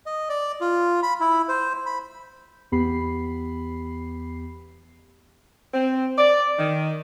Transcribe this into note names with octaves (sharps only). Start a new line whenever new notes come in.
D#5
D5
F4
B5
E4
C5
B5
E2 B3 G4 B5 C7
C4
D5
D#3